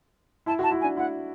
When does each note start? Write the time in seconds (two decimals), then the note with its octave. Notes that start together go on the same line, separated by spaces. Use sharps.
0.46 E4 A5
0.59 F#4 A5
0.71 E4
0.80 G#5
0.84 D4
0.97 E4 F#5